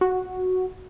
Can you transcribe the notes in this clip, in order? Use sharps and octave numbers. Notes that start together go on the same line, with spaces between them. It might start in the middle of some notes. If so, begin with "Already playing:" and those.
F#4